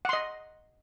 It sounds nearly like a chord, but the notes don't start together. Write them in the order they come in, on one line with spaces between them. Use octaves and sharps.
F#5 C6 D#5